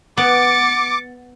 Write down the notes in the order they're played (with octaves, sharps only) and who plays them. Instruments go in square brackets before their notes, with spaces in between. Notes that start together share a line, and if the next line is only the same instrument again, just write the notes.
[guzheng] B3 [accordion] D6 [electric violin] A6 C#7